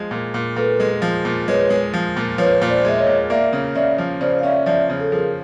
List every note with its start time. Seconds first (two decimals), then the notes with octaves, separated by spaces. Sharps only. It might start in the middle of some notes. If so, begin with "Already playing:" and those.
Already playing: F3 G#3
0.11 A#2
0.34 A#2
0.56 A#2 A4 B4
0.80 G#3
1.02 F3
1.25 A#2
1.48 G#3 B4 C#5
1.70 G#3
1.94 F3
2.17 A#2
2.38 F3 B4 C#5
2.62 A#2
2.69 C5 D5
2.85 G#3 E5
2.99 C#5 D#5
3.07 A#2
3.30 A#3 D5 E5
3.53 C#3
3.75 C#3 D5 E5
3.98 F3
4.21 C#3 C5 D5
4.39 F5
4.43 C#4 D5 E5
4.66 F3 D5 E5
4.89 C#3
5.00 A4
5.12 F3 G#4 A#4